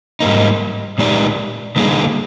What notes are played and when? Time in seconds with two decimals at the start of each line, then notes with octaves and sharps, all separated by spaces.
0.20 G#2 G3 A#3 D#4
0.98 A#2 G#3 D#4 G4 D5
1.76 D3 G3 A#3 D#4 G#4